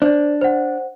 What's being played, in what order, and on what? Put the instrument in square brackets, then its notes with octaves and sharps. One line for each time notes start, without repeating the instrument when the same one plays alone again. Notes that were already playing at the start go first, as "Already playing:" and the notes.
[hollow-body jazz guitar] D4 [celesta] C5 D5
[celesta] C5 F#5